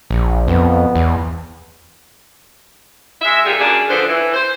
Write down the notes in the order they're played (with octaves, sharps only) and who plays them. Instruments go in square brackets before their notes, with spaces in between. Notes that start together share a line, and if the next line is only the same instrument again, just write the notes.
[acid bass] A#1
[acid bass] F2 [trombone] B3
[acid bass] E2
[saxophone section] G#3 E5
A#2 D3 F4 G4 G#4
F#2 A#3 D4 G#4
D3 F3 B3 D4 C5
E3
C5